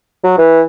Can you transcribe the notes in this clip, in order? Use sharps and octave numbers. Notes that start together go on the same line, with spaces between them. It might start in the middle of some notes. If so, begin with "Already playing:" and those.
F#3
E3